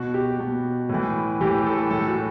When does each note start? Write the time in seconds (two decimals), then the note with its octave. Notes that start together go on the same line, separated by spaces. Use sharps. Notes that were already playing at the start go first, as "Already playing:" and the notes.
Already playing: B2 F#4
0.14 G4
0.40 B2
0.89 A2 E3
1.41 A2 E3 G4
1.66 A4
1.90 A2 E3 A4
2.08 F#4